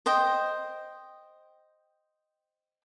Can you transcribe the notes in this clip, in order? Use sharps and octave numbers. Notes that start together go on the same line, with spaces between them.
C5 D#5 G5